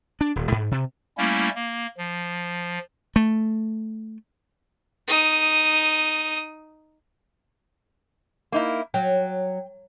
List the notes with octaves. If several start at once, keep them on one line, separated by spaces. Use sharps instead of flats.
D4
D#1
G#2
C3
G3 A3 A#3 C#4 E4
A#3
F3
A3
D#4 D#6
A#3 D#4 E4
F#3 G5